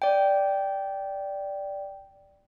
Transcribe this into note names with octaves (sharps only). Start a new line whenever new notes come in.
D5 G5